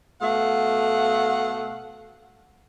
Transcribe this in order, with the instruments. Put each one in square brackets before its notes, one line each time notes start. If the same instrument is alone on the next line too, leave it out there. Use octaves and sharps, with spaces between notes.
[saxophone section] B2 A3 F5 F#5